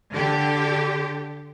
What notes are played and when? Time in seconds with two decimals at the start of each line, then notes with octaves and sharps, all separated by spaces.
0.12 D3 G4